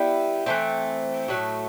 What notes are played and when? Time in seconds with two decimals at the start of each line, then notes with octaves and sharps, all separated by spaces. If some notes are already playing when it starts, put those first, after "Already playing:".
Already playing: G3 B3 E4
0.46 E3 A3 C4
1.28 A2 F#3 A3